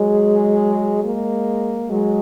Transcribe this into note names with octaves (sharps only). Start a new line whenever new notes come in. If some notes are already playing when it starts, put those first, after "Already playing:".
Already playing: F#3 G#3
G#3 A#3
F#3 G#3